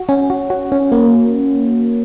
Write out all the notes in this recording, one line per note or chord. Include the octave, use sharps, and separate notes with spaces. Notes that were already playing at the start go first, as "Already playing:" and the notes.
Already playing: F#4
C#4
F#4
F#4
C#4
A#3